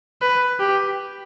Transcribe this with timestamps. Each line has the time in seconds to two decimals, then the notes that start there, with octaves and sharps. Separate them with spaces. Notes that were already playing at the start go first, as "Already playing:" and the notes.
0.21 B4
0.60 G4